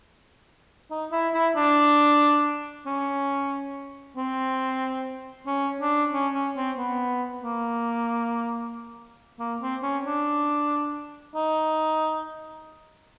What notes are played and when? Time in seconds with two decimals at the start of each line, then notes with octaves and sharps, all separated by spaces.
0.91 D#4
1.12 E4
1.34 E4
1.56 D4
2.86 C#4
4.17 C4
5.47 C#4
5.81 D4
6.13 C#4
6.35 C#4
6.56 C4
6.78 B3
7.43 A#3
9.40 A#3
9.61 C4
9.83 C#4
10.05 D4
11.35 D#4